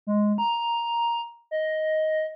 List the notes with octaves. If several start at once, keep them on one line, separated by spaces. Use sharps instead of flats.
G#3
A#5
D#5